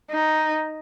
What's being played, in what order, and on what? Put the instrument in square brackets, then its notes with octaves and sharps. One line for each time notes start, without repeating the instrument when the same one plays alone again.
[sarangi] D#4